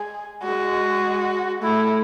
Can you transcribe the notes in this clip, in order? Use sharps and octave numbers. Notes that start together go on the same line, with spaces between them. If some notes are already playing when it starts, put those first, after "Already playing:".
Already playing: G#3 G#4
G#3 F#4
A3 E4